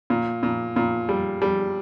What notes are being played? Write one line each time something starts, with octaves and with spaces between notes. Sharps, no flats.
A#2
A#2
A#2
G3
G3